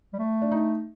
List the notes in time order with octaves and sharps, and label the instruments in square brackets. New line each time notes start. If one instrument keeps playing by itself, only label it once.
[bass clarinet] G3
A3
[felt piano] D4
D#4